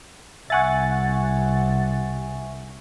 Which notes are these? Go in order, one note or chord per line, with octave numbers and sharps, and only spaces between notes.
C2 E5 F#5 G#5 C#6 A6